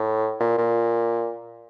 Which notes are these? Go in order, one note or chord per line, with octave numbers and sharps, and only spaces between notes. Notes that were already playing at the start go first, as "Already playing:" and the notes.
Already playing: A2
A#2
A#2